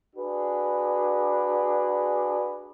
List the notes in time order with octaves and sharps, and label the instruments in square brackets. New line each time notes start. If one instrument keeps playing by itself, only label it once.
[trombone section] D4 F#4 G#4 B4